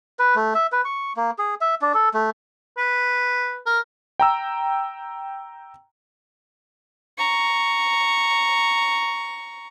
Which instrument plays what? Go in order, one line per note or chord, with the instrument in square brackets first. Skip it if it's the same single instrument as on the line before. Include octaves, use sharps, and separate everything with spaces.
[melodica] B4
A3
E5
B4
C#6
A#3
G#4
E5
D4
A4
A3
[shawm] B4
A#4
[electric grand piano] G5 A#5 E6
[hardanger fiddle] A#5 C#6